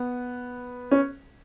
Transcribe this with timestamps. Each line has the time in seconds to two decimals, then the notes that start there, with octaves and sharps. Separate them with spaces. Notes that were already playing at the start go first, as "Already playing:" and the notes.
Already playing: B3
0.91 C#4